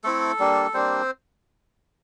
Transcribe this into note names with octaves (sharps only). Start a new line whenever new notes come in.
A3 C4 E4 A4
G3 A#3 D4
G3 A#3 C4 D4 C5